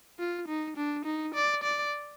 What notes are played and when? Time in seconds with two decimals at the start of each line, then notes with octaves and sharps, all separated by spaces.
0.19 F4
0.48 D#4
0.76 D4
1.05 D#4
1.34 D5
1.64 D5